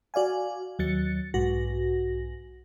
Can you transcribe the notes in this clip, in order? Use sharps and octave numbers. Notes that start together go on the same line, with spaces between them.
F#4 D5 F5 G#5
D#2 F#3 A6 C#7
B1 G#2 F#4 A#6